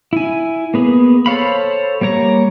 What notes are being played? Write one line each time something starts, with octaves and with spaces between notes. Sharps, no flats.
E4 G#5
A#3 B3 G#4
A4 C5 C#5 F5 B5
G3 A#3 C#5 A#5